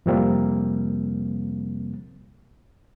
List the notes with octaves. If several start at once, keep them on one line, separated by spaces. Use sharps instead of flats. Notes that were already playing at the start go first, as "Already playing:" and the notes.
F2 C3 F3 G3 A#3 C4